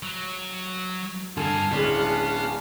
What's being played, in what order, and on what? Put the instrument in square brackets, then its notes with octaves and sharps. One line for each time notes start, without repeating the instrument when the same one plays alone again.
[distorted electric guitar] F#3
[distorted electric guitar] G2 A#4 [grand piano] D3 [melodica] F5 G#5 A5
[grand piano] D1 G#3 [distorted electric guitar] B3 [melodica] C#4 D4 F5